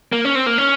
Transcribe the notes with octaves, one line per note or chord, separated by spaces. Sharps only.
A#3
C#4
C4
A#3
C#4